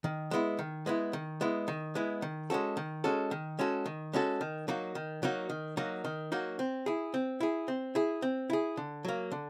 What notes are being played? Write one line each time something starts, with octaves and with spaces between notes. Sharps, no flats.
D#3
G#3 B3 E4
D#3
G#3 B3 E4
D#3
G#3 B3 E4
D#3
G#3 B3 E4
D#3
G#3 C#4 F#4 A4
D#3
G#3 C#4 F#4 A4
D#3
G#3 C#4 F#4 A4
D#3
G#3 C#4 F#4 A4
D#3
F#3 A#3 D#4 F#4
D#3
F#3 A#3 D#4 F#4
D#3
F#3 A#3 D#4 F#4
D#3
F#3 A#3 D#4 F#4
C4
E4 G#4
C4
E4 G#4
C4
E4 G#4
C4
E4 G#4
D3
F#3 A#3
D3